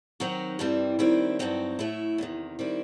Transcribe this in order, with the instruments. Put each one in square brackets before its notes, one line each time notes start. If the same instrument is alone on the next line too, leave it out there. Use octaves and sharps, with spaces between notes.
[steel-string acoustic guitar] D#3 F#3 C4 D#4 F#4
G2 E3 G3 C4
D#2 D#3 G3 C4 E4
G2 F#3 C4 D#4 F#4
A2 F#3 A3 E4
E2 C3 D#3
D#3 G3 C4 E4